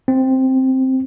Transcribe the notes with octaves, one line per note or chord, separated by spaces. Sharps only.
C4